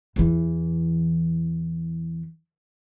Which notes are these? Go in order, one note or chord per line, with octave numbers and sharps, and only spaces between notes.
E2 E3